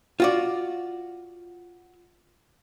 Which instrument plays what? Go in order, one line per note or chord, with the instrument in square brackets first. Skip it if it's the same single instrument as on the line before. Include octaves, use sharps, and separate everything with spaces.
[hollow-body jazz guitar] F4 F#4 D5